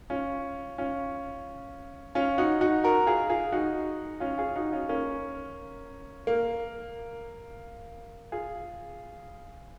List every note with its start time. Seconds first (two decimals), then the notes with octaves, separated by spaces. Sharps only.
0.10 C#4 F4
0.78 C#4 F4
2.15 C#4 F4
2.38 D#4 F#4
2.61 D#4 F#4
2.84 F#4 A#4
3.07 F4 G#4
3.30 F4 G#4
3.52 D#4 F#4
4.20 C#4 F4
4.38 F4 G#4
4.56 D#4 F#4
4.72 C#4 F4
4.89 A#3 C#4
6.27 A#3
8.32 F4 G#4